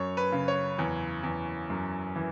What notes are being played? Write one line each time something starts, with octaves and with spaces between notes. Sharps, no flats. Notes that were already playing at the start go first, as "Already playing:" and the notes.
Already playing: F#2 C#5
B4
C#3
C#5
E2
E2
F#2
E3